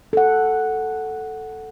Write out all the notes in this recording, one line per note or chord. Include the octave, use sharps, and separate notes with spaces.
A4 F#5